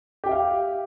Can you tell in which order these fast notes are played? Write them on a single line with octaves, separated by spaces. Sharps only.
G4 G5 E5 F5